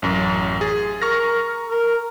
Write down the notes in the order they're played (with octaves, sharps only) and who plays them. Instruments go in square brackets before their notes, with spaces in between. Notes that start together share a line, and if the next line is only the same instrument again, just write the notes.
[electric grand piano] A1 F#2
G#4 A6
[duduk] A#4 [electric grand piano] C#6 F6 A#6
[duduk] A#4